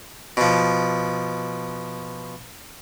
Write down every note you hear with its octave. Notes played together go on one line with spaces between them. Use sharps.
B2 F3